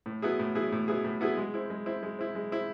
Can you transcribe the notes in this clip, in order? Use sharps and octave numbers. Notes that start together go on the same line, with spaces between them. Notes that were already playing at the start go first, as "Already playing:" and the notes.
A2
F#3 B3 E4 G#4
A2
F#3 B3 E4 G#4
A2
F#3 B3 E4 G#4
A2
F#3 B3 E4 G#4
G#3
C4 E4
G#3
C4 E4
G#3
C4 E4
G#3
C4 E4